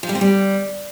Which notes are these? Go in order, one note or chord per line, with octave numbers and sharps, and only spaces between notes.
F3
G3
C4
G3